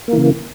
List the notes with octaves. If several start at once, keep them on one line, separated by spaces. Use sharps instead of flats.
C#3 E3 A#3